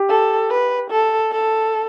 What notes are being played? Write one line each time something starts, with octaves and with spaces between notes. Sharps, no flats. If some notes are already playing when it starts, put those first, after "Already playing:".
Already playing: G4
A4
B4
A4
A4